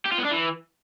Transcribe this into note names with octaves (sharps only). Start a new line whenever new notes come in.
G4
F4
B3
D4
E3